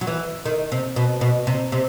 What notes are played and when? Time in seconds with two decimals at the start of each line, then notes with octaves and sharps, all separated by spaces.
0.01 F#3
0.07 E3
0.45 D#3
0.72 C3
0.96 B2
1.21 B2
1.47 C3
1.72 C3